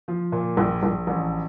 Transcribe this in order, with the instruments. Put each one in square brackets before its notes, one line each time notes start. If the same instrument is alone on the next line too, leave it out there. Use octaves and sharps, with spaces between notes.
[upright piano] F3
A#2
A#1
A#1
A1